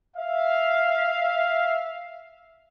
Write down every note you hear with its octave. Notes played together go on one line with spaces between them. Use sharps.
E5 F5